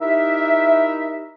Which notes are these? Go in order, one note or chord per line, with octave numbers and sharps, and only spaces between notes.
D#4 E4 G4 A#4 E5